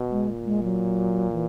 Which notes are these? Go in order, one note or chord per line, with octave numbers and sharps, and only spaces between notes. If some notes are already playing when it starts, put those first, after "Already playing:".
Already playing: B2
G#3
A#2
G#3
F#3
E3